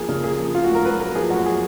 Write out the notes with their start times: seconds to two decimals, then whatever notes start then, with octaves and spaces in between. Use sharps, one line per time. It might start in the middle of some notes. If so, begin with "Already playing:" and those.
Already playing: F3 A#3 G#4
0.09 C#3
0.23 A#3 G#4
0.39 F3
0.55 A#3 F4
0.64 F#4
0.70 G#2
0.75 A#4
0.85 F#3 B4
1.00 A#3 A#4
1.15 F3 G#4
1.30 F#2 F#4
1.46 G#4